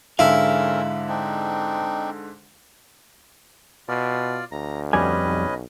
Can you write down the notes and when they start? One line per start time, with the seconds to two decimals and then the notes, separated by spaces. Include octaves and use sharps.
0.19 G#2 D3 G#3 C#4 E4 A4 A#4 F5
1.08 C4 D4 D#4
3.88 B2 F4 D5
4.52 D2 A#5
4.93 F2 G3 C#4 B4 D#5 G#5
5.24 B1